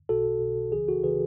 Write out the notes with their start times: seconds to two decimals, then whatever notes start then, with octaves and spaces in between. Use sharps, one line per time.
0.09 B1 B2 F#4 A4
0.41 B1 B2
0.72 C#2 C#3 E3 G#4
0.88 F#4 A4
1.04 C#3 E3 G#4 B4